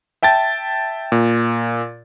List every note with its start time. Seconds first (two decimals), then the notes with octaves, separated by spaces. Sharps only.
0.23 E5 G5 A5 A6
1.12 A#2